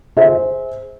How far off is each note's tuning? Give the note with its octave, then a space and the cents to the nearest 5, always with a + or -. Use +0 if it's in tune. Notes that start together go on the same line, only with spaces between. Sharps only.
G#4 +0 C5 +0 E5 -30